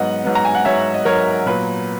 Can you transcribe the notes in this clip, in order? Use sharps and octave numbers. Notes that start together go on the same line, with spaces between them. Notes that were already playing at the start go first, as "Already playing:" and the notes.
Already playing: G#2 F#3 B3 D#5 F#5
G#2 F#3 B3
A#5
G#5
F#5
G#2 F#3 B3 C#5 E5
D#5
G#2 F#3 B3 A#4 C#5
A#2 F#3 B3 B4